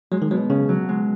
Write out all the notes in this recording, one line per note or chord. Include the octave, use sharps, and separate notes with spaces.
F#3 G#3
D#3
B2 F#3
C#3 C#4
F#3
G#3